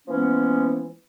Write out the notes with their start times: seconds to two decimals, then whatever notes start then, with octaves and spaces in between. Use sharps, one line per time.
0.08 E3 F3 G#3 A#3 B3 C#4